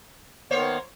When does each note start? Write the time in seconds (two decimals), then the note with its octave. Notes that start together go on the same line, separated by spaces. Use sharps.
0.51 D#3 A#3 B3 C5 C#5